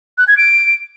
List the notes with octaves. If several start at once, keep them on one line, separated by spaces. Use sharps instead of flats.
F#6
G#6
D7